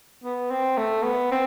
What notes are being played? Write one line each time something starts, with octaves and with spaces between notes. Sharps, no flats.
B3
C4
A3
B3
C4